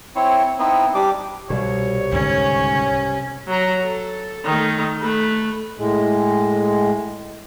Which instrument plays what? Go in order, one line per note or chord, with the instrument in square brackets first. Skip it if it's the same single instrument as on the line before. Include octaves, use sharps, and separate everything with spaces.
[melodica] C4 E4 C#5
B3 C4 D#4 E4
G3 D4 G4 D6
[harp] C2 [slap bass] B2 G3 [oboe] C#5
[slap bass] C#2 G#2 D3 [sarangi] C#4
[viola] F#3 A#5
A4
D#3 A3
A3 B4
[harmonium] A2 G#3